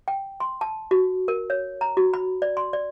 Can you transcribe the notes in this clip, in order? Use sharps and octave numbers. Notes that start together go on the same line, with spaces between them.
G5
C6
A5
F#4
A#4
C#5
A#5
F#4
B5
D5
C6
D5